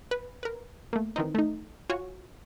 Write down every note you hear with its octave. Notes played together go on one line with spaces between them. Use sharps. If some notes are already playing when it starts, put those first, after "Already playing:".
B4
A#4 B4
A3 A#3
D#3 E3 C4 D#4
A3 D#4
F4 F#4 C#5 G#5 C#6